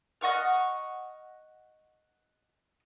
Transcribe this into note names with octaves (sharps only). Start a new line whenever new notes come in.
D#5 F#5 C#6 F6